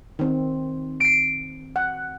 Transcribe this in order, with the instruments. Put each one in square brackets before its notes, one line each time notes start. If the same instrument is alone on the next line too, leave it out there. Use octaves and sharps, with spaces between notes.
[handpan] D#3 C4
[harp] C7 D7
[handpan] F#5